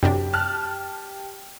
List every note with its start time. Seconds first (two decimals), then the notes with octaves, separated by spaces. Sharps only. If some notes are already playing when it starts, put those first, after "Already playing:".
0.03 F#2 C3 D4 G4
0.33 A5 F6 F#6